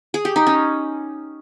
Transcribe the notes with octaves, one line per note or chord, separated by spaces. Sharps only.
G#4
G4
D#4
C#4